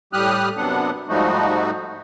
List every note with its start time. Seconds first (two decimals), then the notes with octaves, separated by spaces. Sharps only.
0.13 A2 G3 G4 D#6 F6 F#6
0.57 F#2 C3 F#3 B3 D4 F#5
1.09 G#2 F3 G3 A3 D#4 F#4